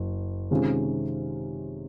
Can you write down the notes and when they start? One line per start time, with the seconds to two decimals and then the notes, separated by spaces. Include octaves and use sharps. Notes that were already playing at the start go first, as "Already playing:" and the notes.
Already playing: F#1
0.51 C3 D#3 G#3 C#4 F4